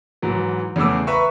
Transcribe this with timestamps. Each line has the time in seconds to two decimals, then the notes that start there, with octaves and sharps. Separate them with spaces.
0.22 G#2 E3 F#3
0.76 E2 C#3 E3 A3 D6 E6
1.07 B4 E5 A#5 C#6